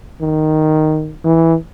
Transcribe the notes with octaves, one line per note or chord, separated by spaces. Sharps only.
D#3
E3